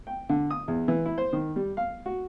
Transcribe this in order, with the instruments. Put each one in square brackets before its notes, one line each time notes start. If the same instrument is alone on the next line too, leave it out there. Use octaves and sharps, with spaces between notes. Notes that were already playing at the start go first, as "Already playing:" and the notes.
[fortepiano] G5
D3
D#6
E2
E3
E4
C5
D#3
G3
F5
F#4